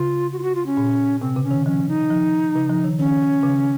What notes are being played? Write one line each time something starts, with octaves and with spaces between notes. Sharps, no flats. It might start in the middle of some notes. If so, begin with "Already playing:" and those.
Already playing: C#3 F4
F#4
F4
F#4
F4
C#4
A#2
C3 C4
C#3
C#4
D#3
F3 C#4
D#4
F3
C#3
F3
D#3
D#3 C#4
C#3